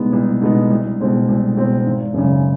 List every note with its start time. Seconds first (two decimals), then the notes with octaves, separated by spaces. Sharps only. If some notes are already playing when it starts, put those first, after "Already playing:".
Already playing: C2 B2 G#3 B3 D#4
0.13 C2
0.42 B2 G#3 B3 D#4
0.70 C2
1.00 B2 G#3 C4
1.29 C2
1.57 B2 G#3 C4
1.86 G#1
2.14 F#2 C#3